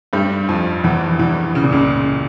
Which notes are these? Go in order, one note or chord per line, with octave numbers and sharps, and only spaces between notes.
G2 G3
F2 F3
E2 E3
E2 E3
C#3
A#2
C#2 C#3